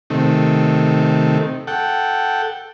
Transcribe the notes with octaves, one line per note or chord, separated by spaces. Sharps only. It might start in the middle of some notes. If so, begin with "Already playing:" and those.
C3 D#3 A3
A4 F#5 G5